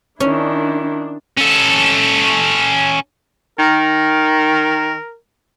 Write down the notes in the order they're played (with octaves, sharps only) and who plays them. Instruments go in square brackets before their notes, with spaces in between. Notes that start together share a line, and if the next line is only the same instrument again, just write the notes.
[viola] D#3 E4 [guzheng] C#4 [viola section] D4
[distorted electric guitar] C#4 A4
[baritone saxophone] D#3 [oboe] A#4